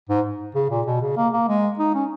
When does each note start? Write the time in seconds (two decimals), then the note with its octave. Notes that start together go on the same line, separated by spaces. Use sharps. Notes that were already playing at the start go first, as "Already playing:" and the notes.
0.09 G#2
0.55 C#3
0.70 A#2
0.87 B2
1.01 C#3
1.17 A#3
1.33 A#3
1.48 G#3
1.79 D#4
1.94 C#4